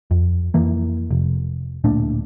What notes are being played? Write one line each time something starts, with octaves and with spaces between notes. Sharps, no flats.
F2
F2 E3 A#3
F1
D1 A#2 A3 D4